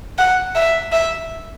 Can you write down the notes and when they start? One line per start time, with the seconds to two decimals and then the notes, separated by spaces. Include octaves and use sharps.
0.18 F#5
0.55 E5
0.92 E5